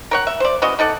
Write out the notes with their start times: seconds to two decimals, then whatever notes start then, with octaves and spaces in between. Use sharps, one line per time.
0.11 A#4 C#5 F#5
0.27 E5
0.40 C5 D5
0.62 E3 C#4 F#4 D#5
0.79 D#4 A4 D5 F#5